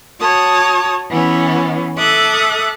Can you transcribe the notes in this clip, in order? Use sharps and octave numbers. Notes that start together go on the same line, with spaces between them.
F#4 C#5 A5 D#6
E3 B3 C#4
A4 E5 D6 D#6 F#6